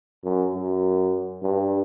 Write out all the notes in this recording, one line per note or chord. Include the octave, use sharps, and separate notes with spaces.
F#2
F#2
G2